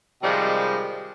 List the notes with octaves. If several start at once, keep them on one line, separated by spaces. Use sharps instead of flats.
C3 D#3 F3 G3 G#3